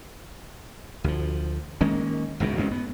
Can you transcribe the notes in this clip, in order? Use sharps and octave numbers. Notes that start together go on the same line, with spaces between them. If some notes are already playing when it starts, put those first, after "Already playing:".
D2 F3
D#3 G#3 A#3 C#4
G#1 C#2 F#2 B2
A1 F#2 G#3 C#4
B3